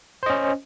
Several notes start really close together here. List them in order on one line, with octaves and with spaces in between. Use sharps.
C5 D#5 C#4